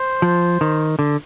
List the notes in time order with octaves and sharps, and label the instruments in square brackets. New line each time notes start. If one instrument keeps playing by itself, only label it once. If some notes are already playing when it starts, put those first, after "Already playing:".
Already playing: [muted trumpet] C5
[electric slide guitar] F3
D#3
D3